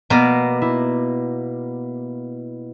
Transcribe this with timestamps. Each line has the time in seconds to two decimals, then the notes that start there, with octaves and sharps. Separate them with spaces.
0.10 B2 A#3 B3 A#4 D5
0.62 E4